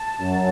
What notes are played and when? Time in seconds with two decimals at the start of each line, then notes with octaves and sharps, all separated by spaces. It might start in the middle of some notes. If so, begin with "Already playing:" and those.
Already playing: A5
0.18 F#2 F#3